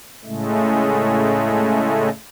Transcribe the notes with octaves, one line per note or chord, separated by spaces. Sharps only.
A2 C#3 G#3 A3